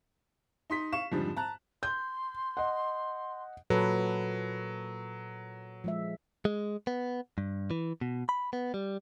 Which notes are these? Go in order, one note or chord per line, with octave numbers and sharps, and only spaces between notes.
D#4 C6 B6
F5 C#6 E7
F2 G#2 D3 F3 G3
A5 A#5 F#6
C6 G6
D#5 F#5
A#2 F#3 A4 B4
F3 G#3 E5
G#3
B3
G2
E3
B2
B5
B3
G3